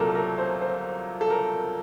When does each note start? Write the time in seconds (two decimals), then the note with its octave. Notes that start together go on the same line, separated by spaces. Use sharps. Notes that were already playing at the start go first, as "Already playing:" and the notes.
Already playing: C2 A#2 F#3 A4 A#4
0.15 A#4
0.38 C5
0.61 C5
1.21 A4
1.30 A#4